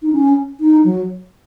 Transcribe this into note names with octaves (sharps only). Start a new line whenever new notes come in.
D#4
C#4
D#4
F#3